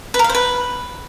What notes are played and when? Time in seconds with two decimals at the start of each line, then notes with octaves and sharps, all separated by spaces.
0.14 B4
0.19 A#4
0.24 F5
0.29 C5
0.35 B4